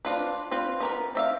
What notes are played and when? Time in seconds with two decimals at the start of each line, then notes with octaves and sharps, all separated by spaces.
0.05 C4 D4 F4 B4
0.51 C4 F4 B4
0.80 B3 A#4 B4
1.15 C4 E5 F5